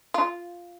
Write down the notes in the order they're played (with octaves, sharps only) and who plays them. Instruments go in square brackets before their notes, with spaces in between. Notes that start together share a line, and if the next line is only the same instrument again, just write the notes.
[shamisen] F4